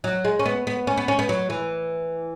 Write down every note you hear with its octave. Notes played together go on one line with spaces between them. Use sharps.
F#3
G#3
C#4
B3
B3
C#4
B3
C#4
B3
F#3
E3